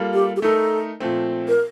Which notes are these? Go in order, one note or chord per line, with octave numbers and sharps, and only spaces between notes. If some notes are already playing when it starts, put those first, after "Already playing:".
Already playing: G3 A#3 F4 A4
G4
G4
A3 D#4 A4 A#4
A#2 F3 A3 C4
A#4